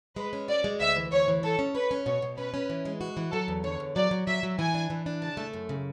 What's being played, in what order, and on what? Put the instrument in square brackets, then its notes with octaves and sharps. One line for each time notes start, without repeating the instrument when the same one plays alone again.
[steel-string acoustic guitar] G#3 [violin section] B4
[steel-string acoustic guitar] C#4
[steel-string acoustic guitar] F#4 [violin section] D5
[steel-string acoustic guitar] G#3
[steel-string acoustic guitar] D2 [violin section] E5
[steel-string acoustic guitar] E3
[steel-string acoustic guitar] D2 [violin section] C#5
[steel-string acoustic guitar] E3
[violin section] A4 [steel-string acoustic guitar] C#5
[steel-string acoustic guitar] C#4
[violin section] B4 [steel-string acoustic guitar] C#5
[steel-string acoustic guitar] C#4
[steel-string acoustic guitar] B2 [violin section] C#5
[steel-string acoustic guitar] B2
[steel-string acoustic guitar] C#4 [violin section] B4
[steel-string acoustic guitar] C#4
E3
G#3
F#4
E3
[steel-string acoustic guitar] F#3 [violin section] A4
[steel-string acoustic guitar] E2
[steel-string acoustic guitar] D3 [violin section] C#5
[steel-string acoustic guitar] E2
[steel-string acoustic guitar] F#3 [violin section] D5
[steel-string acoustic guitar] F#3
[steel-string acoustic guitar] F#3 [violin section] E5
[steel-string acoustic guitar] F#3
[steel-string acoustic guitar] E3 [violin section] G#5
[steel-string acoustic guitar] D4
E3
D4
[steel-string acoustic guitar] C#3 [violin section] A5
[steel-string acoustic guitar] A3
F#2
C#3